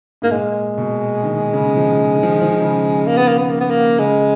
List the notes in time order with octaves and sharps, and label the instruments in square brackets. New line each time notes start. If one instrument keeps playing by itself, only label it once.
[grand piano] G#2 [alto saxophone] A#3
[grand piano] A#2 [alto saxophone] G#3
[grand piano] B2
D#3
C#3
F3
D#3
D#3
F3
D#3
F3
D#3
C#3
[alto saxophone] A#3
B3
A#3
B3
A#3
B3
A#3
[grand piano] C#3 [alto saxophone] G#3